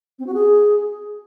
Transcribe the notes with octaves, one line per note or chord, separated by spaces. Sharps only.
C4
F#4
G#4